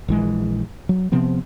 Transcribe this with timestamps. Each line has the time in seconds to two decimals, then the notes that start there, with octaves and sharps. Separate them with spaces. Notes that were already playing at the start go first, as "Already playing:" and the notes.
0.08 A#1 E3 G#3
0.89 F#3
1.12 C3 F3 B3 C4